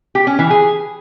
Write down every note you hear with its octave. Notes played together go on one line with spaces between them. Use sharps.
G4
C#4
E3
G#4